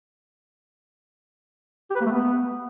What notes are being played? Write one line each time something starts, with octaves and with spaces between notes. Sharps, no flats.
G4
B4
A#3
A3
B3